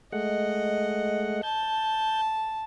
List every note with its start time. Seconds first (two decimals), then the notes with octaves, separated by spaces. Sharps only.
0.12 G#3 A3 D#5 F#5
1.43 A5 G6